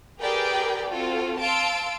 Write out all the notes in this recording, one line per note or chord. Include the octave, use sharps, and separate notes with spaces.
G4 G#4 A#4 B4 D5 G5
C4 F4 F#4 A4
F5 A5 C6 E6 D7